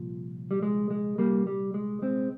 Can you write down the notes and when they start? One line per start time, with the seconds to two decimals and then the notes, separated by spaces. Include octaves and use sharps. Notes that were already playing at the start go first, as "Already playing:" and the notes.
Already playing: C2 A#2 F3
0.51 G3
0.62 G#3
0.91 G#3
1.18 G3 A#3
1.47 G3
1.74 G#3
2.02 G#3 C4